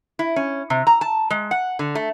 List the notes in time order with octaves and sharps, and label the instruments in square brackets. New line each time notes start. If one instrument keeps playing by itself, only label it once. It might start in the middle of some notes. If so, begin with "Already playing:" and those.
[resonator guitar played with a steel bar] E4
C#4
C3
A#5
A5
G#3
F#5
D3
A3